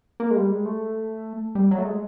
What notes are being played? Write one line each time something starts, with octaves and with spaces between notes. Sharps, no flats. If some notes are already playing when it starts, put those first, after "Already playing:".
A#3
G#3
G3
G#3
A3
G3
F#3
A3
G#3